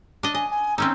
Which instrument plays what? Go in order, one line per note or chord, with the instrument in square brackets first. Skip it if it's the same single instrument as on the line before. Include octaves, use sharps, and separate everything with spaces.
[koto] D4 D#5
[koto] D#5 [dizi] G#5
[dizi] G#5
[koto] C4 C#4 D#4 [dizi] E6